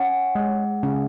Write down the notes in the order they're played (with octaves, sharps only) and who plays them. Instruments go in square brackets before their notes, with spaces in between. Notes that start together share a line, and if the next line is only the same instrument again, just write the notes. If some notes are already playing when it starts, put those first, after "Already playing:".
Already playing: [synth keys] C#4 [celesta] F#5
[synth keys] G#3
C#3